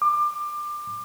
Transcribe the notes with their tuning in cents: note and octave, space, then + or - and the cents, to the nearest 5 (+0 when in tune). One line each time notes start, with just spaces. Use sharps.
D6 +25